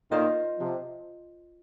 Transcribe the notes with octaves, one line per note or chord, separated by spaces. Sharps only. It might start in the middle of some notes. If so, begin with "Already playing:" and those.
A#2 D#3 F4 C5 D#5
C3 F3